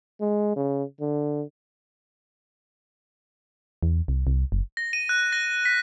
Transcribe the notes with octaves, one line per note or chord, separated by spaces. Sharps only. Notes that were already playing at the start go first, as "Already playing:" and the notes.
G#3
C#3
D3
E2
C2
C2
F#1
A#6
D#7
F#6
A#6
B6